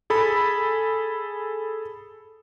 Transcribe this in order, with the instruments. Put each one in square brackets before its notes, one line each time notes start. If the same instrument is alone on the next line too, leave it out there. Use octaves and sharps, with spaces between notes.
[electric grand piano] G#4 A4 B5